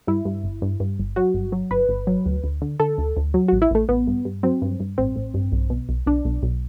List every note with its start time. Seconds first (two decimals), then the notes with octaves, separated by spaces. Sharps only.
0.07 G2 E4
0.25 G2
0.44 G1
0.62 G2
0.80 G2
0.99 G1
1.16 F#3 F#4
1.34 G1
1.52 F#3
1.71 G1 B4
1.89 G1
2.07 F#3
2.26 D2
2.44 D2
2.62 D3
2.80 D3 A4
2.98 D2
3.17 D2
3.34 F#3
3.48 A1 F#4
3.62 E4
3.71 A1 A3
3.89 A1 B3
4.07 G2
4.25 G2
4.43 F#3 C4
4.62 G2
4.80 G2
4.98 A1 C4
5.16 A1
5.34 G2
5.52 B1
5.70 B2
5.89 B1
6.06 B1 D4
6.25 B1
6.43 B1